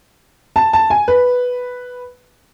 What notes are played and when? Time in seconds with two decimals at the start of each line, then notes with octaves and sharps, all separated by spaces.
0.56 A5
0.73 A5
0.90 G#5
1.08 B4